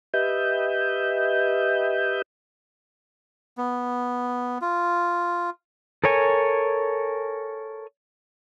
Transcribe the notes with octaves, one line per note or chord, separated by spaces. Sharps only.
G4 B4 D#5 E5 G6
B3
F4
A4 A#4 C#5 G#5